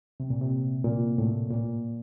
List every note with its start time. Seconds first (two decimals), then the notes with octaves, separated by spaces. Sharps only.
0.20 C3
0.30 A#2
0.41 C3
0.85 A#2
1.18 A2
1.50 A#2